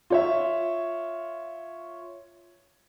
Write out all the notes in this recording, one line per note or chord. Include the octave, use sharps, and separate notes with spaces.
F4 C#5 E5